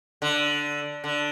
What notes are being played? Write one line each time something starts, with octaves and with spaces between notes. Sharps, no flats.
D3
D3